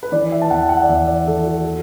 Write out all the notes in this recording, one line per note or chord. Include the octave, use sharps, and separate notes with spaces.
B4
E3 D5
E5
A5
E2 F#5
F#5
D5
E2 E5
D5
E3 A4
F#4
A4